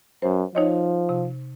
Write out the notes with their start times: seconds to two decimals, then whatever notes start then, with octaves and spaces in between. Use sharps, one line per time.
0.22 F#2 C5
0.55 F3 D#4 C#5 D#5
1.09 C3